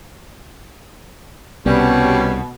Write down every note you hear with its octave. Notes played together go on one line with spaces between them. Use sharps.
C2 B2 G3 B3 C#4